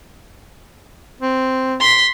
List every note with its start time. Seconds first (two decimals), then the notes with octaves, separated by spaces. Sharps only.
1.21 C4
1.80 C6 B6